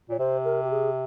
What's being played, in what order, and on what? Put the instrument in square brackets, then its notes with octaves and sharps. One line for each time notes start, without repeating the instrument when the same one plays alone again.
[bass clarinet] A#2 [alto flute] C#5
[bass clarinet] C3 [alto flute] C5
[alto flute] A#4
G4
G#4